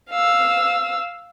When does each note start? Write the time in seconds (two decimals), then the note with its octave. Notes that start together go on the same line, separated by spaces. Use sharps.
0.11 F5 E6